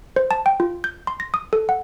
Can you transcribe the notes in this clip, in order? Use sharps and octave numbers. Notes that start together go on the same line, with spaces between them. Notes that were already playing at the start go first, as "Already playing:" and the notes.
C5
A5
G5
F4
G6
C6
A#6
D#6
A4
F#5